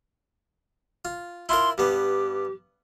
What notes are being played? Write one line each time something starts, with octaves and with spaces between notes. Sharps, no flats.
F4
E4 F4 A#4 C6
G2 B3 G4